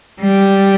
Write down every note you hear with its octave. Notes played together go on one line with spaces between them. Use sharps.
G3